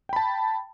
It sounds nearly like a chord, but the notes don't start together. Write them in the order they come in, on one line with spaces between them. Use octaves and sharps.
G5 B5 A5